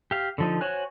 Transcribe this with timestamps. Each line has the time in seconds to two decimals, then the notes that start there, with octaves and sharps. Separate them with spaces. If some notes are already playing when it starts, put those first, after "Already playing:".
0.11 G4 F5
0.38 D3 F3 D#4
0.61 F#4 C5 C#5 G#5 F#6